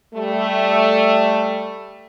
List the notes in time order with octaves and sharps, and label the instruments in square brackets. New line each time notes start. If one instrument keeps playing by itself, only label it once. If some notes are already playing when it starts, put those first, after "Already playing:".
[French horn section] G3 A3